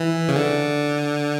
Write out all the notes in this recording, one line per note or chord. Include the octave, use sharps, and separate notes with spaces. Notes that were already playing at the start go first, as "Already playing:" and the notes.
Already playing: E3
C#3
D3